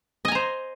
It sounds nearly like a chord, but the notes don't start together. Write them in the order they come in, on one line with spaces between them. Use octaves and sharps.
D#5 G#5 A#5 C5